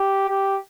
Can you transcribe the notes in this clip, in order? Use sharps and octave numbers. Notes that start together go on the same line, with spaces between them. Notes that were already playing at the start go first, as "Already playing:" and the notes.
Already playing: G4
G4